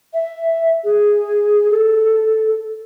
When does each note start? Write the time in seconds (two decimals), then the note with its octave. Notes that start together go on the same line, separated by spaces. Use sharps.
0.14 E5
0.84 G#4
1.70 A4